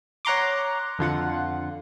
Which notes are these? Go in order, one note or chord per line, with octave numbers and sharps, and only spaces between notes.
C#5 F#5 A#5 C6 D6
F2 D3 F4 F#5